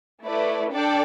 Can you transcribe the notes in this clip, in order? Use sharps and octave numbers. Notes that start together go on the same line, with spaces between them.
A3 E4 B4 D5
D4 A4 D5 G5